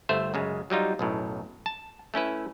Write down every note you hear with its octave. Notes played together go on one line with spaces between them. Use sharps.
G1 A3 C5 E5
F#2 C#3 G#3
F#3 G3 D#4 F4
B1 F#2 A2
A5
A3 C#4 E4 B4